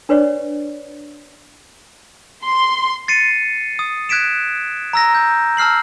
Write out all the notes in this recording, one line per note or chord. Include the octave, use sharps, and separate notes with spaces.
D4 B4 C#5 D5
C6
A6 C7 C#7 D#7
D#6
F#6 G#6 B6 D7 E7
A#5 E6 A#6
G6
A5 E6 F6 C7 F#7